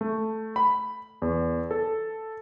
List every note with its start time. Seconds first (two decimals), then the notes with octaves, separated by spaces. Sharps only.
0.01 A3
0.56 B5
1.22 E2
1.71 A4